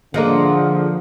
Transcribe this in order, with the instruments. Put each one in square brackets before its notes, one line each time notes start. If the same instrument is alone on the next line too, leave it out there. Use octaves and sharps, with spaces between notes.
[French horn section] D3 [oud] F3 [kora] A#3 D#5 F#5 [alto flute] G#4